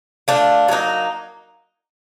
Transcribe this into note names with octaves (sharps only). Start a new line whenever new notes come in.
A3 D4 F4
F#3 A#3 D#4